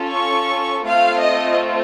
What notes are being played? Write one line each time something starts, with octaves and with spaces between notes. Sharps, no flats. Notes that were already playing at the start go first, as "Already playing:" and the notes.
Already playing: C#4 F4 A4
C#6
A3 C4 F4 F5
D#5